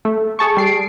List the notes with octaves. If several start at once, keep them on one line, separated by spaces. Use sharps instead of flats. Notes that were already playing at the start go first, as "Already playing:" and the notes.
A3
G#4 A5 C#6
G3 C7 D7